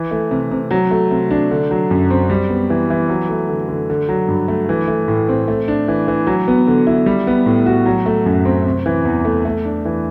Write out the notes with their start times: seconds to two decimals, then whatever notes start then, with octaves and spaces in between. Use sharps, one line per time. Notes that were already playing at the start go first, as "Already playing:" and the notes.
Already playing: E3
0.11 A3
0.31 C3
0.51 C3
0.71 F#3
0.91 A3
1.11 C3
1.31 D4
1.51 D3
1.71 F#3
1.91 F#2
2.10 C4
2.30 G3
2.50 B3
2.70 E3
2.90 E3
3.09 F#3
3.29 A3
3.49 D3
3.69 D3
3.90 D3
4.09 F#3
4.28 G2
4.48 A3
4.69 E3
4.88 A3
5.08 A2
5.29 C4
5.48 A3
5.68 D4
5.88 E3
6.08 E3
6.27 F#3
6.48 B3
6.67 D3
6.87 E4
7.06 G3
7.27 B3
7.46 A2
7.66 F#4
7.86 F#3
8.06 A3
8.26 F#2
8.45 C4
8.66 C3
8.86 E3
9.05 E2
9.25 A3
9.45 A3
9.65 D4
9.85 E3